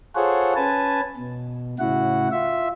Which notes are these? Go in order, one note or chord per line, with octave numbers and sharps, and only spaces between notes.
F4 G#4 A4 C5 C#5 F#5
C#4 B4 G#5 A5
B2
A2 C#3 E4 F#4 F#5
F4 E5